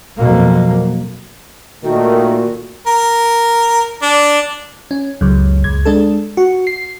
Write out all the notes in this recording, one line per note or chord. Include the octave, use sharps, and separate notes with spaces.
F2 B2 F#3 A#3
A#2 D#3 A3 F#4
A#4
D4
C#4
C#2 F#2
C#2 G#6
G#3 D4 A4
F#4
C7